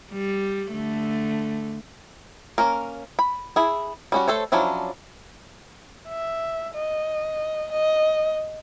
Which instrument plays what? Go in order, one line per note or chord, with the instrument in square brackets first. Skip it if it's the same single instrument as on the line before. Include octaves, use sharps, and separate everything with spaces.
[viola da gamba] G3
D3 A3
[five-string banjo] A#3 C#4 A#4
B5
E4 G#4
G3 C#4 F#4
A3 A4 C5 C#5
F3 F#3 C#4 D4 E4
[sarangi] E5
D#5
D#5